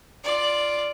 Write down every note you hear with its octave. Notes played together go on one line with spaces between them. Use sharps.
F4 D5